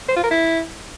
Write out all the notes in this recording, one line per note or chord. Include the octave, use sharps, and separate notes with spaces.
C5
F4
A#4
E4